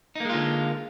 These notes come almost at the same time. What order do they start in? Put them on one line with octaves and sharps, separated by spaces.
D#4 A#3 G#3 F4 D3